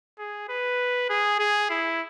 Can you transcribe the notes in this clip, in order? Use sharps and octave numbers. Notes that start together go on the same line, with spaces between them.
G#4
B4
G#4
G#4
E4